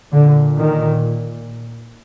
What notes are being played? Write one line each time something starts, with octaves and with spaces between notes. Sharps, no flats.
A#2 D3
D#3